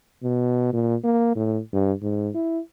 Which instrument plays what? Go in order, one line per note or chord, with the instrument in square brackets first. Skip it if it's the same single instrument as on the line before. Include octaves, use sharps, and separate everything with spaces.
[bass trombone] B2
A#2
A#3
A2
G2
G#2
E4